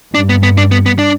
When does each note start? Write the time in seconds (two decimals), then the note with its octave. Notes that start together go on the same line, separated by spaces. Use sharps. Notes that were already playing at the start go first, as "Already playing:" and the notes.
0.15 G2 D4
0.29 B3
0.43 B3
0.58 D4
0.71 B3
0.86 B3
0.99 D4